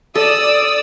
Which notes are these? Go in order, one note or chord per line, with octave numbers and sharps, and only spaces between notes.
A4 D5 D#6 E6